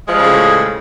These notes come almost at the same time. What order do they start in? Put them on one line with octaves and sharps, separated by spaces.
G#3 F3 G3 C#3 A2